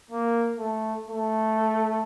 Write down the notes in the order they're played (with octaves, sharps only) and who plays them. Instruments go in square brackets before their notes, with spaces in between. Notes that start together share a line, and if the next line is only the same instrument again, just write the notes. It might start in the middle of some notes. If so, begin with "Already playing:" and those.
[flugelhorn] A#3
A3
A3